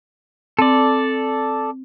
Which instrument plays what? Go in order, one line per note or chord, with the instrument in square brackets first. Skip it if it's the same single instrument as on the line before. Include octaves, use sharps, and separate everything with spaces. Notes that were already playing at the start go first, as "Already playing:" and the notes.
[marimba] C4 [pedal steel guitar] A4 D5